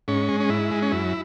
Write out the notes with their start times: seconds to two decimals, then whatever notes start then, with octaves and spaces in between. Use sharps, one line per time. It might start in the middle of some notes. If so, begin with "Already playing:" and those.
0.08 G#2 C#4
0.29 G#3
0.40 C#4
0.49 G#2 E4
0.71 G#3
0.82 C#4
0.92 F#2 E4